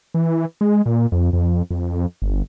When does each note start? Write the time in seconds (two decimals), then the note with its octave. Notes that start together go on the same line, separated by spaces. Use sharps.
0.14 E3
0.61 G#3
0.86 A#2
1.12 F2
1.33 F2
1.71 F2
2.22 G1